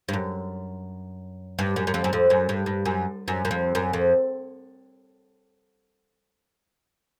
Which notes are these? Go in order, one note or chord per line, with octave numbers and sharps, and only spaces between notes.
G2
F#2
G2
F#2
F#2
F2
F#2
F2
F#2
G2
G2
F#2
F#2
F#2
F2
F#2
F2